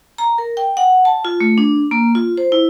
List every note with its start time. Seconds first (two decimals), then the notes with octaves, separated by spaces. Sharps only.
0.18 A#5
0.38 A#4
0.57 G5
0.77 F#5
1.05 A5
1.25 F4
1.41 A3
1.58 D4
1.91 A#3
2.15 F4
2.38 C5
2.52 E4